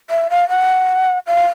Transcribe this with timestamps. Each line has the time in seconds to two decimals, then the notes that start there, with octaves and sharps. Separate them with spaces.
0.10 E5
0.30 F5
0.49 F#5
1.26 F5